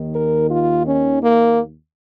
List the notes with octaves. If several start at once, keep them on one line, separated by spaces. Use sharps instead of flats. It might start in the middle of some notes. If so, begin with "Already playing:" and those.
Already playing: D#2 D#3
A#4
F4
C#4
A#3